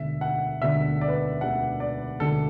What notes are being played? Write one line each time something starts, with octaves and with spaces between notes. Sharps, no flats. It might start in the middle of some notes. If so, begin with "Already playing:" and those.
Already playing: E1 D2 D3 E5
F#5
E1 D2 D3 E5
D5
B4
D5
E1 D2 D3 F#5
D5
E1 D2 D3 A4